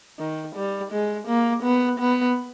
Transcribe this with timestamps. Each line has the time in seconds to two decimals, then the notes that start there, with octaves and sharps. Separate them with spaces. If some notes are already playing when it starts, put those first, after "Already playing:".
0.19 D#3
0.56 G3
0.92 G#3
1.28 A#3
1.63 B3
2.00 B3